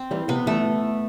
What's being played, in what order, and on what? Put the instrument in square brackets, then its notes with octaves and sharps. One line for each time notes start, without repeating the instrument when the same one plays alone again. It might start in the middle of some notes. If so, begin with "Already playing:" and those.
Already playing: [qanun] C4
[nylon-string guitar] E3 G3
[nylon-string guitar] C3 [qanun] B3
[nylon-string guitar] E3 G3 [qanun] A3